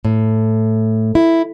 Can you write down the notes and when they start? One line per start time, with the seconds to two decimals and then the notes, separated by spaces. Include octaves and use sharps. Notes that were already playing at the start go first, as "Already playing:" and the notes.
0.05 A2
1.15 E4